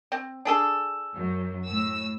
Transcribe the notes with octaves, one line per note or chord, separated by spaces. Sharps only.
C4
D4 G#4 A4
F#2
A2 E6